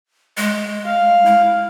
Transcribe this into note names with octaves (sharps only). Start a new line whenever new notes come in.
G#3
F5
E4